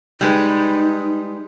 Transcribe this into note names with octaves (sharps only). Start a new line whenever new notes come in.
G3 G#3 D#4 B4